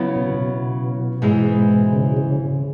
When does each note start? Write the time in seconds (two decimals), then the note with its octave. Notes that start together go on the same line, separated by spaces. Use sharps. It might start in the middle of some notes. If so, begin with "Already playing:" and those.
Already playing: C#3 F#3 B3 E4
0.16 B2
0.34 B2
1.22 G#2 E3 G#3 E4
1.93 C#3
2.17 C#3
2.40 C#3